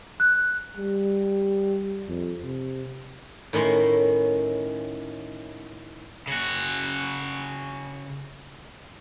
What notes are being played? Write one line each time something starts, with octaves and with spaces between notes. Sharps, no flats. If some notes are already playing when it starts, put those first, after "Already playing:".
F#6
G3
F2
C3
A2 D#3 C#4 B5 C6
C#3 F#4